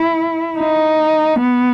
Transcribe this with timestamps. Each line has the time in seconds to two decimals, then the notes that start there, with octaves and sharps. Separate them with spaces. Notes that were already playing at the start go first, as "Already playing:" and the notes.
Already playing: E4
0.59 D#4
1.41 B3